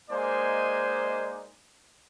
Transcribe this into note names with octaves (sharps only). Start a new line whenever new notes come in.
G#3 A#3 D#4 C5 D5 G#5